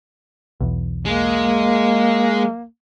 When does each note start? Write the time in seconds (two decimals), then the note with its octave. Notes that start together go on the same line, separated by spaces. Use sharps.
0.60 B1 E2
1.05 G#3 A#3